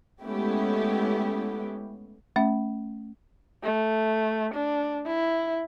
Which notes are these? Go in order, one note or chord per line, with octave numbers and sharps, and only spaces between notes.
G#3 A3 B3 C#4 E4 G4
A3 C#4 E5
A3
D4
E4